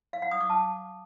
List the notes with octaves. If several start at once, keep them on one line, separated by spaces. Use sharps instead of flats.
F5
F#5
D#6
D6
A5